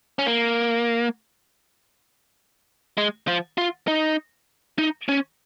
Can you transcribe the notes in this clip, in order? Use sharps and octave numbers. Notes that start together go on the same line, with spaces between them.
C#4
A#3
G#3
F3
F4
D#4
D#4
C#4